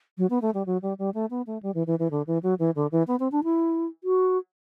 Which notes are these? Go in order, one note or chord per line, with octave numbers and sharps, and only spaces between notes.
F#3
B3
A3
G3
F#3
G3
G3
A3
B3
A3
G3
E3
E3
E3
D3
E3
F#3
E3
D3
E3
B3
C4
D4
E4
F#4